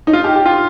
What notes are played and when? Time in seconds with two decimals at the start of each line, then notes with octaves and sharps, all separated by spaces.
0.07 D#4
0.13 F4
0.24 G4
0.35 G4
0.46 F4